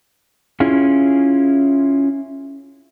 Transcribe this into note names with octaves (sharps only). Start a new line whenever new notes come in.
C#4 E4 F4 G#4